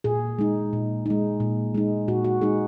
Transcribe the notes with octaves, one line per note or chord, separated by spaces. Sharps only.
A#2 G#4
G#3 D#4
A#2
G#3 D#4
A#2
G#3 D#4
A#2 F#4
F#4
G#3 D#4 G#4